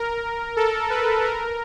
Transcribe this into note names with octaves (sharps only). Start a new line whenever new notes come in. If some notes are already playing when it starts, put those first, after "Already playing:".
Already playing: A#4
A4
B4
A#4